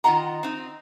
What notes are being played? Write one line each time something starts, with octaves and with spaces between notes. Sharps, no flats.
D#3 F4 D#5 F#5 A#5
C4 D#4